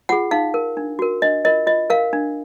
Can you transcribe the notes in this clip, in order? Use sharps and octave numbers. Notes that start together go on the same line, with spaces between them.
F4 G#4 F#5
D#4 F5
A#4
D4
F#4 A#4
D4 D#5
F4 A#4 D#5
F4 D#5
A#4 F5
D4